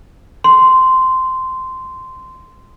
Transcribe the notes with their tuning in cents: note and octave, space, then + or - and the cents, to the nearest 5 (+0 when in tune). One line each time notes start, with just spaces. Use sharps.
C6 -10